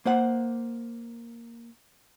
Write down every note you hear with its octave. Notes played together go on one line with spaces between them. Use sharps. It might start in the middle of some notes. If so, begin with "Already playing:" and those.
A#3 C5 F#5